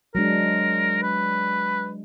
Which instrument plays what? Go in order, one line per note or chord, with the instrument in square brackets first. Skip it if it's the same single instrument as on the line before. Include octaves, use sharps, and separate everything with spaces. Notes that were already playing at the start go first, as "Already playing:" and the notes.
[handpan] F#3 G#3 D4 [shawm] A#4
[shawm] B4